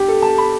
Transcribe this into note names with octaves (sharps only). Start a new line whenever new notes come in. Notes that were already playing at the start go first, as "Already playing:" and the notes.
Already playing: G2 G4
A4
A5
B5